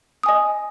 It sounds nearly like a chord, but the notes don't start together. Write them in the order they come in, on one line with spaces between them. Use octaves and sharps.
D#6 G#5 D#5